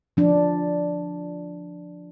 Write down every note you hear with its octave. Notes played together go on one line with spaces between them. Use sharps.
F3 D4